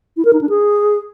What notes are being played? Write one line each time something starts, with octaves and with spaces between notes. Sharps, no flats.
E4
A#4
D#4
D4
G#4